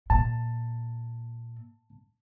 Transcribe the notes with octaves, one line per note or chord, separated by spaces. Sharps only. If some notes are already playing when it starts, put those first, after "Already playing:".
A#2 A5